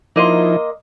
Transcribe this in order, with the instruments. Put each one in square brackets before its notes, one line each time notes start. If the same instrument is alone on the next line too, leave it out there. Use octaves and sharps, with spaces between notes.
[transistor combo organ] F3 D#4 E4 [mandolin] A#3 D#5 C6